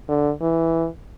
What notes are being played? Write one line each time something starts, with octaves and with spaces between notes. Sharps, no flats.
D3
E3